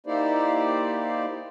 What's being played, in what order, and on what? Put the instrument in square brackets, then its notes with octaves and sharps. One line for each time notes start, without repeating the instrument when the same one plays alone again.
[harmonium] A#3 D#4 E4 G4 C5 D5